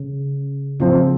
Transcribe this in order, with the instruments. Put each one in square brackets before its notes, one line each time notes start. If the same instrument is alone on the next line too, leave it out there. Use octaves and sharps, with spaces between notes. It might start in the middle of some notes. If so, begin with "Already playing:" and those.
Already playing: [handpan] C#3
[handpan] C#3 [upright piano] F3 C4 F4